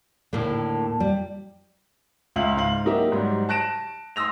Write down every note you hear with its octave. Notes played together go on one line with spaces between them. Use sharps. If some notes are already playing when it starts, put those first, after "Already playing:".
D#2 A2 D3 A#3
G3
C#2 E5 F5 F#7
G#2 F5 F#7
F#3 A#3 D#4 G4 A#4 E5
G#2 F#3 G3
A5 F#6 A#6 D7 E7
C6 D#6 E6 A#6 F7